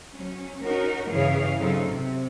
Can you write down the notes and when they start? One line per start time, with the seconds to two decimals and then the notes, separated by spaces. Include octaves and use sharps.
0.16 F#3 C#4
0.62 C#4 D#4 F#4 A#4
1.09 G2 C#3 E3 G#4 C#5 F5
1.59 C#3 F#3 C4 D#4 F4 A4
1.90 C3